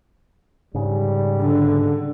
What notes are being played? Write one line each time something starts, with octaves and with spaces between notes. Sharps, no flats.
G#2 C#3 G3
D3